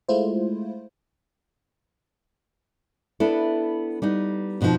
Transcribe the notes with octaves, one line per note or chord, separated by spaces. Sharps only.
G#3 A3 E4 F4 C5
B3 D4 E4 A4
G3 B3 D#4
F2 B2 D#3 F3 D#4